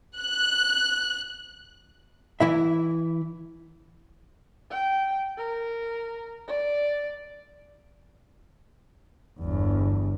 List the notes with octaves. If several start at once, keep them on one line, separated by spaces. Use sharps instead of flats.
F#6
E3 E4 E5
G5
A#4
D5
G1 E2